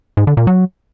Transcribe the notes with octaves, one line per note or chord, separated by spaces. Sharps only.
G#2
D3
A#2
F#3